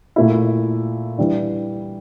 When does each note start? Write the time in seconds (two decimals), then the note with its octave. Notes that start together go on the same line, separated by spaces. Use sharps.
0.16 A#2 A3 E4
1.18 E3 G3 D4